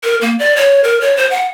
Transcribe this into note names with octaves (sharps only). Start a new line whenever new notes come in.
A#4
A#3
D5
C#5
A#4
C#5
C5
F#5